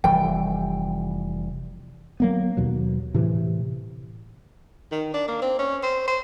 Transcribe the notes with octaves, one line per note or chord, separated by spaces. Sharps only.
F1 E3 G3 G5
F#3 A#3 B3
D#2 B2 F#3
A2 C3 E3
D#3
D4
A#3
C4
C#4
C5
C5